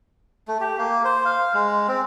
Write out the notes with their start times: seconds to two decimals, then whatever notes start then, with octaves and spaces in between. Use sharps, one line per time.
0.48 A3
0.60 G4
0.78 A#3
1.04 C5
1.25 F5
1.54 G#3
1.88 C4